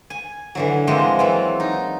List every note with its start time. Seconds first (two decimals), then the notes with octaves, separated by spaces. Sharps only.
0.10 G#5
0.55 D3 E3 F#3
0.87 E3 F3 G#3 A#3 C4
1.19 E3 F#3 F4
1.60 D#4